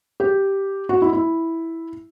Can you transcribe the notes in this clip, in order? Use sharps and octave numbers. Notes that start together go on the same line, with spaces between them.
G4
F#4
E4
E4